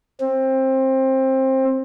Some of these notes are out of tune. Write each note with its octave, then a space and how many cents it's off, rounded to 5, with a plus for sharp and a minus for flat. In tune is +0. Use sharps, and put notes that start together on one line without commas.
C4 +20